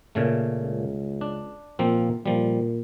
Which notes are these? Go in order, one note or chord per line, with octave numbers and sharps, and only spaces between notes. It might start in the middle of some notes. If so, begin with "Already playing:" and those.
A#2 C#3 A3
C#2
D4
A#2 F3 A#3 C4
A#2 F3 G3